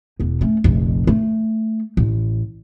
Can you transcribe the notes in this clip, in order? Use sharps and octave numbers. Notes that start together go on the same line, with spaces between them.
E1 E2
A3 C#4
F1 A#1
A3
A1